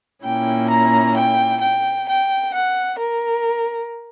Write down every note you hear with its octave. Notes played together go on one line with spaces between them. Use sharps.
A#2 A#3 C#4 E4 G5
A#5
G5
G5
G5
F#5
A#4